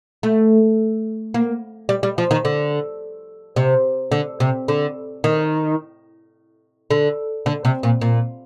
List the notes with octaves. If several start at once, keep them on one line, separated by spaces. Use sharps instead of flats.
A3
A#3
G3
G3
F3
D#3
D3
C3
D3
C3
D3
D#3
D3
D3
C3
A#2
A#2